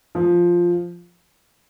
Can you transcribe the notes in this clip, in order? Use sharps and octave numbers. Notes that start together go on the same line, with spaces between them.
F3